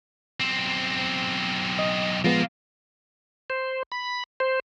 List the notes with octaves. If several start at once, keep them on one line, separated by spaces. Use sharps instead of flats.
B1 C4
D#5
F3 G#3 A#3 B3 F4
C5
B5
C5